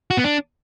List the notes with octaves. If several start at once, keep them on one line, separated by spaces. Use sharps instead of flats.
F#4
B3
D4